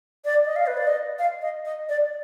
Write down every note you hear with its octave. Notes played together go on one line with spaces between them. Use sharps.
D5
D#5
F5
B4
D5
D#5
F5
D#5
D#5
D5